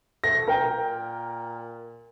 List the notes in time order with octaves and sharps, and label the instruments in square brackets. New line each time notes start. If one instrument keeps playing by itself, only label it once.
[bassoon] A3 [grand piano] A#6
[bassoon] A#2 [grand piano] A#4 G5
[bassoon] A#2